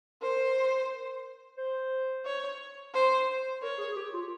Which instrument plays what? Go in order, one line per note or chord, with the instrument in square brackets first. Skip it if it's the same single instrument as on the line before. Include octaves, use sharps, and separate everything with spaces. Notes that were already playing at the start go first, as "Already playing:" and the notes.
[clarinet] A#4 [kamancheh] C5
[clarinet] C5
[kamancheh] C#5
C5
[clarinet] A#4 [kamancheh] C#5
[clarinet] G#4
G#4
G4
F4